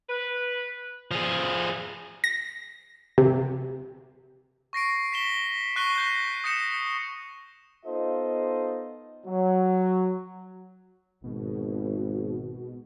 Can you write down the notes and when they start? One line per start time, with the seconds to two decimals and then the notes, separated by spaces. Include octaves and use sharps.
0.10 B4
1.11 F3 G#4
2.24 A#6
3.18 C3
4.73 C#6 A#6 C7 D7
5.12 B6 E7 G7
5.76 C#6 F#6 A#6 C7 D#7 G7
5.95 F#6 G6 A#6
6.44 D#6 G6 A#6 C#7 E7
7.85 B3 D#4 F4 A4 C5 D#5
9.26 F#3
11.24 G#1 B2